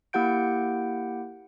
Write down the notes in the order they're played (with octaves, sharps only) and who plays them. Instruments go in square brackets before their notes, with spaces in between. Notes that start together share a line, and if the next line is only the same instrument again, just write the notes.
[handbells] A#3 E4 G4 F#5 G6 D7